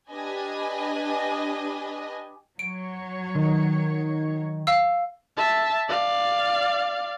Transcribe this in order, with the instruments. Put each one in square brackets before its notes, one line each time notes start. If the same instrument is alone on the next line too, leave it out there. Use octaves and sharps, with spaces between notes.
[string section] D4 G4 B4 D#5 G#5
[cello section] F#3 C#5 [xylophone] D7
[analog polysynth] D#3
[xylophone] F5 E6
[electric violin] E5 A5
D5 F5